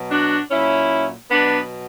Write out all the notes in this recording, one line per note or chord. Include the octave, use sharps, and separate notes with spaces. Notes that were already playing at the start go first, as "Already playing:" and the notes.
Already playing: B2 F#3
D4 F#4
A#2 F#3 C#4 E4
B2 F#3 B3 D4